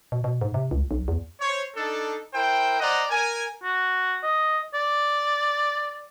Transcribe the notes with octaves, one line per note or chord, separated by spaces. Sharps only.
B2
B2
G#2
C3
C#2
B1
E2
C5 C#5
D4 D#4 A4
E4 A#4 C5 G5
C5 D5 D#5 F#5 A#5
A#4 G#5
F#4
D#5
D5